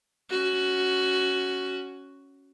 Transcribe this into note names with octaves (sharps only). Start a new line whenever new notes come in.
C#4 F#4